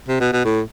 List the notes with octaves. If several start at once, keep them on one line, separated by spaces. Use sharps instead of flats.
C3
B2
B2
A2